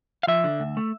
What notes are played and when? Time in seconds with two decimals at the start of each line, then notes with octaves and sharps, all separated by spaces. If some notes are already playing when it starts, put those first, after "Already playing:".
0.23 F5
0.27 F3 E5
0.44 D3
0.60 D2
0.77 A3